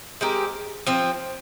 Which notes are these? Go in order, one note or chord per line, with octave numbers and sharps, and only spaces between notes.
G#3 C4 G4 A#4
F3 C4 F4